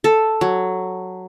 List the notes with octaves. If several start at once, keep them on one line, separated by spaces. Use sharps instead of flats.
A4
F#3